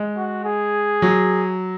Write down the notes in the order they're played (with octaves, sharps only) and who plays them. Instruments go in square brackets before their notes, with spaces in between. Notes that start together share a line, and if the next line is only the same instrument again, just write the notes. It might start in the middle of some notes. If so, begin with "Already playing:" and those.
Already playing: [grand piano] G#3
[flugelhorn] F#4
G#4
[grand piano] F#3